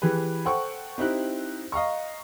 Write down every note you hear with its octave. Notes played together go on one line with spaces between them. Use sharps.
E3 G4 G#4 B4
A4 C5 F#5 G5 C#6
C4 D#4 E4 G4 F#6
D#5 F5 A#5 C#6